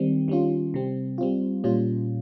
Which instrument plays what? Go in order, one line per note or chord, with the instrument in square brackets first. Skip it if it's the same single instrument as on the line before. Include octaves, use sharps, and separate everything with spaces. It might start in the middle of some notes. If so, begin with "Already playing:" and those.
Already playing: [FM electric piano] D#3 G3 C4
D#3 G3 C#4 F4
C3 G3 C4
G3 C4 F4
A#2 G3 C#4 F4